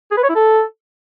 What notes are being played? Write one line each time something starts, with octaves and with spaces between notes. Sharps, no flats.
G#4
B4
C#5
E4
A4